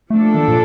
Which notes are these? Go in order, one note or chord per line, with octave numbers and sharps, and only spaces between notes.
F3 A3 A#3 D4 A4
D#3
A#2